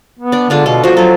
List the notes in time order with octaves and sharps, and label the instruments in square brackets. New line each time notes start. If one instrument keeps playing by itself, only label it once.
[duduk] B3
[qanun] D4 D5
[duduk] D3 [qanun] G#3 D4 F4
[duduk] B2 [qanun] F4 A4
[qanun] F3 C5 [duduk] F#4
[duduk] F#3 [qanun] F4 A4